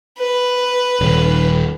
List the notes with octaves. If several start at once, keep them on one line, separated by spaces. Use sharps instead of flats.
B4
D#1